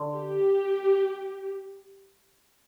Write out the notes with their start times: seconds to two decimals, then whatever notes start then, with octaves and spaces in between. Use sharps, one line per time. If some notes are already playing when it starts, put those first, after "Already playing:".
Already playing: D3
0.14 G4